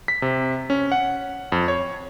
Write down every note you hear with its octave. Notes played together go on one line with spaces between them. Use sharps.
B6
C3
C#4
F#5
F2
C#5